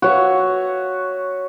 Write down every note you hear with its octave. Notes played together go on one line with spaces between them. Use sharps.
F#4 C#5 E5